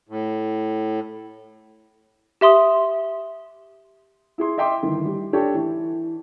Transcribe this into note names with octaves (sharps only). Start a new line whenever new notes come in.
A2
G4 E5 C6 D#6
E4 G#4 C6
D#5 E5 G5 C6 D6
G1 D#3 E3
G3
D4 G4 A4 C#5 G5
E3